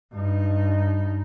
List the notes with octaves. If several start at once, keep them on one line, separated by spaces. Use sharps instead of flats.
G2 D#4